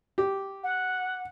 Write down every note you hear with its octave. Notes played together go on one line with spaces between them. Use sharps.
G4
F#5